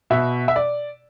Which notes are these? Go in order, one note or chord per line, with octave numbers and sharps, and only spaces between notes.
B2 E5
E5
D5